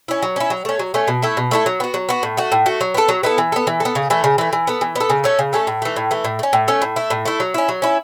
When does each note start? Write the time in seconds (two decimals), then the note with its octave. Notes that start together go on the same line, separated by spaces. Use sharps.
0.08 C#4 E4
0.22 F#3
0.36 C#4 E4
0.50 F#3
0.65 A3 C#4
0.79 F#3
0.94 A3 C#4
1.08 B2
1.22 A3 E4 A4
1.37 B2
1.51 A3 E4 A4
1.66 F#3
1.80 B3 F#4
1.94 F#3
2.09 B3 F#4
2.23 A2
2.37 A3 F#4
2.52 A2
2.66 A3 F#4
2.81 F#3
2.94 B3 E4 A4
3.08 F#3
3.23 B3 E4 A4
3.38 E3
3.52 B3 A4
3.67 E3
3.80 B3 A4
3.95 C#3
4.10 E3 A3
4.24 C#3
4.38 E3 A3
4.53 E3
4.67 B3 A4
4.81 E3
4.96 B3 A4
5.10 C#3
5.24 A3 C#4 A4
5.39 C#3
5.53 A3 C#4 A4
5.67 A2
5.82 E3 A3
5.96 A2
6.11 E3 A3
6.24 A2
6.39 A3
6.43 C#4
6.53 A2
6.68 A3 C#4
6.82 A2
6.96 A3 E4
7.10 A2
7.26 A3 E4
7.40 F#3
7.54 C#4 E4
7.69 F#3
7.82 C#4 E4